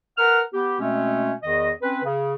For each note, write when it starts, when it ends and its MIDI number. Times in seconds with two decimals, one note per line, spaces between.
0.18 0.41 70
0.18 0.41 71
0.18 0.41 78
0.18 0.41 89
0.54 0.77 59
0.54 0.77 67
0.80 1.33 47
0.80 1.33 56
0.80 1.33 57
0.80 1.33 60
0.80 1.33 61
1.43 1.70 40
1.43 1.70 51
1.43 1.70 75
1.83 2.02 60
1.83 2.02 61
1.83 2.02 71
2.04 2.34 49